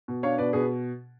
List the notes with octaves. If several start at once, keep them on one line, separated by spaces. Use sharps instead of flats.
B2
D4 C#5 F5
B2 B4 D5
B2 G#4 B4